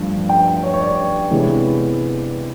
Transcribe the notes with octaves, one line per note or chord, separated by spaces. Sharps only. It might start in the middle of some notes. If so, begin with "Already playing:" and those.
Already playing: G2 F3 A3
G5
C#5
C#5
D5
C3 E3 G#3 B3